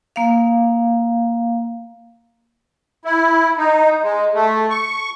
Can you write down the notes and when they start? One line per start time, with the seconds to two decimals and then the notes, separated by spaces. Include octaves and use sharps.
0.16 A#3 F5
3.05 E4
3.58 D#4
4.03 G#3
4.35 A3
4.70 C#6